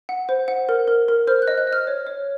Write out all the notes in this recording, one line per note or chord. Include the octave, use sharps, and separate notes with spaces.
F#5
C5
F#5
A#4
A#4
A#4
C5 F6
F#6
D#5
F#6
D#5
F6
C#5
C#5